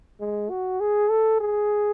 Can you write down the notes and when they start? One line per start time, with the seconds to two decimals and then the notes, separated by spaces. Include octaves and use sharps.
0.20 G#3
0.50 F#4
0.80 G#4
1.10 A4
1.40 G#4